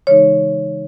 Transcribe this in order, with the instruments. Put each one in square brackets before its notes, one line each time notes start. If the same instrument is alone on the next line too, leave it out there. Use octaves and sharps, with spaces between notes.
[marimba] C#3 E3 G#3 D#4 C#5